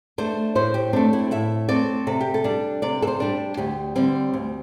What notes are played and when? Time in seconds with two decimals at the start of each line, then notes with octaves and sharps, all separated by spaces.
0.18 A3 D4 C5
0.55 A2 C5
0.74 G4
0.93 A3 C4 D4
1.13 E4
1.31 A2 E5
1.69 A3 C4 D5
2.07 C3 A4
2.21 G4
2.34 A4
2.44 G3 D4
2.82 C3 D5
3.02 A4
3.07 C5
3.20 G3 D4
3.57 D2 G4
3.96 D3 G3 C4
4.34 D2